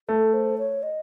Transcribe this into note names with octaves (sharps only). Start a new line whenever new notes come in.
A3 A4
C5
C#5
D#5